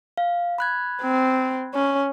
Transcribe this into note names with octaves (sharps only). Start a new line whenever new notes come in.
F5
B5 F#6 G#6
C4
C#4